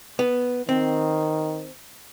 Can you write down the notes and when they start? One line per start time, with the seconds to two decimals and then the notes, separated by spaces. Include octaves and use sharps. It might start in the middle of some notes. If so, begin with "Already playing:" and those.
0.19 B3
0.69 D#3 C4